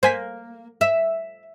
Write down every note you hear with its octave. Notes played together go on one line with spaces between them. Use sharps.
A#3 C5 G#5 B6
E5